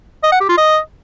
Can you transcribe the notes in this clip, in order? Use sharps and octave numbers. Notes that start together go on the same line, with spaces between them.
D#5
F#5
G4
F4
D#5